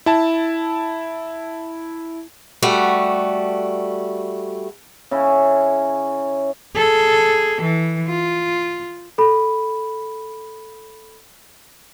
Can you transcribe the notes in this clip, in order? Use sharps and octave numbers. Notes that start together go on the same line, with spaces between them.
E4 A5
G3 A3 F#4
C#3 C#4 E4
G#4 A4
E3
F4
A4 B5